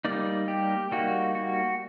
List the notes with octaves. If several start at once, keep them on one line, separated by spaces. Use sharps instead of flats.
G3 A#3 D#4 D5
G4
G3 A#3 D#4 F#4
F#4